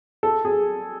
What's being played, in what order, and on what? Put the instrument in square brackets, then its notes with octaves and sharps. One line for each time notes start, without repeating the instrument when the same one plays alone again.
[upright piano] A4
G#4